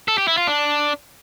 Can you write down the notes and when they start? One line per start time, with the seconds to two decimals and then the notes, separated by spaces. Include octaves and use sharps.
0.08 A4
0.18 G4
0.28 E4
0.37 F4
0.47 D4